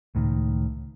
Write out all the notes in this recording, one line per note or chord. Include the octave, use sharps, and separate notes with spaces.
C#2 A2 D#3